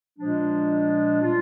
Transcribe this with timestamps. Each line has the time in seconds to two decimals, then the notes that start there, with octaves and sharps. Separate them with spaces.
0.17 A#2 F3 G#3 D4
1.22 G3 D4 F4